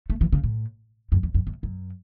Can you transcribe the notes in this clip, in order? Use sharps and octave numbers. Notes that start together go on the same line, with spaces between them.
A3
E3
C#3
A2
F#2
E2
F#2
E2
F#2